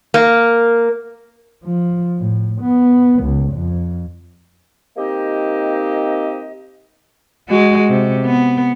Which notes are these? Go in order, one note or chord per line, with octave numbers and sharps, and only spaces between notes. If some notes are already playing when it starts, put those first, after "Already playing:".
A#3
F3
A2
B3
C#2
F2
F3 A#3 C4 D#4 G4 D#5
G#3 F#4
C3
B3